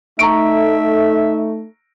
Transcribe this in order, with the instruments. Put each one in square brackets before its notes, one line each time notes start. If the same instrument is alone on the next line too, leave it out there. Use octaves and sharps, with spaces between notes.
[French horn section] A3 [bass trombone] D#4 [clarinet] E5 [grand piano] A#5 C#6 D7